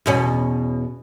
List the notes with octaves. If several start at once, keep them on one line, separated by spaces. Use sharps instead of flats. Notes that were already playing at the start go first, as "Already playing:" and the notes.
E2 B2 C#4